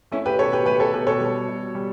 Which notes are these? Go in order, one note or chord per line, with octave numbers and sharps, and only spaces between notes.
A3 C#4 E4
G4 B4
B2 A4 C#5
G4 B4
A3 G4 B4
A4 C#5
B2 G4 B4
A4 C#5
G3
B2
G3